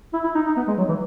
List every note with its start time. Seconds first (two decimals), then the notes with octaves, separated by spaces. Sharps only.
0.13 E4
0.24 E4
0.35 D#4
0.46 D#4
0.57 B3
0.68 G#3
0.78 F#3
0.89 E3